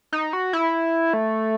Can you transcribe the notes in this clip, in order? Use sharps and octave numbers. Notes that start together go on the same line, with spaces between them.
D#4
F#4
E4
A3